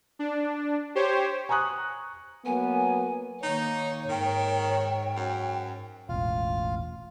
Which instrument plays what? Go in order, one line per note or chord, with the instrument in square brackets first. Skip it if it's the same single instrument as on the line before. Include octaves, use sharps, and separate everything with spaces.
[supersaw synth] D4
G4 C5 C#5
[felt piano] G#5 A#5 C#6 D#6 F#6
[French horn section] F#3 A#3 B3 [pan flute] G#5
[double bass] D#3 A#3 [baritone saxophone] D#4 [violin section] C#5
[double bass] G#2 [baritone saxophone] D#3 [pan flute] G5
[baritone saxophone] F#2
[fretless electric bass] E1 A1 [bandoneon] F4 F5